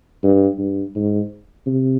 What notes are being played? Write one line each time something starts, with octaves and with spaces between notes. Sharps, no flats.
G2
G2
G#2
C3